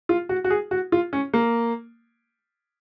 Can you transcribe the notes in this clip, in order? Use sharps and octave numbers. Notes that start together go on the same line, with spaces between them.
F4
F#4
F#4
G#4
F#4
F4
C#4
A#3